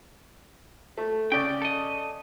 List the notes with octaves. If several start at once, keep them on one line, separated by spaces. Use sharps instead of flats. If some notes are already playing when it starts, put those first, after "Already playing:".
A3
C#3 D5 G5
A4 D#5